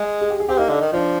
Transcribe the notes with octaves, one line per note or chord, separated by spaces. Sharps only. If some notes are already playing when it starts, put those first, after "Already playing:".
Already playing: G#3
G#4
G4
G#4
C4 G4
A#3 D#4
D3
D#3
F3 D4